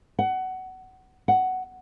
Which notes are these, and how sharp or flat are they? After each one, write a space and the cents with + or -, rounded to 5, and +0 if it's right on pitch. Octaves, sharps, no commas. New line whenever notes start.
F#5 +20
F#5 +10